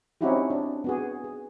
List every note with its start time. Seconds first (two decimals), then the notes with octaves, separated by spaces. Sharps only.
0.21 C4 C#4 D#4 E4 F#4 G4
0.50 D4
0.84 B3 F#4 G#4
1.24 G#4